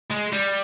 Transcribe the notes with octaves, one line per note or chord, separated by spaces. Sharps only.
G#3
G3